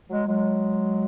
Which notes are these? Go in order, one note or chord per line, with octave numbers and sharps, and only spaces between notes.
F#3 G#3
F#3 G#3